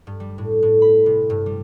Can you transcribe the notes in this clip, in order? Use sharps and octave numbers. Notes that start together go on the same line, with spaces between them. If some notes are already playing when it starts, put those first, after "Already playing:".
G2
G3
A2
A2
B5
C3
G2
G3